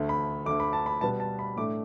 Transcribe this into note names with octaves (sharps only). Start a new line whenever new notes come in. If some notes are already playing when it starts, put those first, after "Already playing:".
Already playing: D2 D3 A3
B5
D2 D3 A3 D6
B5
A5
B5
B2 G3 B3 A5
A5
B5
A2 A3 D4 D6